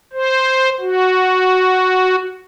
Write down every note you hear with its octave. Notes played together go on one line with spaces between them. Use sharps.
C5
F#4